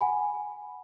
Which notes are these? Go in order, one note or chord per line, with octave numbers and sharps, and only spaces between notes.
F#5 G#5 B5